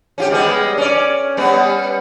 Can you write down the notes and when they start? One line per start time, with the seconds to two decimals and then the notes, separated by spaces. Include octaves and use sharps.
0.18 C#4 F4 G4
0.30 G3 G#3 B3
0.78 C#4 D5
1.37 G3 B3 C#4